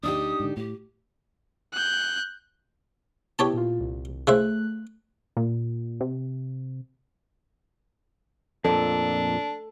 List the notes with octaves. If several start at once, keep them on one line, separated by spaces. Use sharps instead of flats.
D2 D4 D#4 G4 D#6
G#2 D3
A2 G4
F#6 G6
B3 E4 G4 C#5 A5
A#2 F4
C2
C#3 A3 E4 C5 F#6
A#2
C3
F2 A#2 D4 A4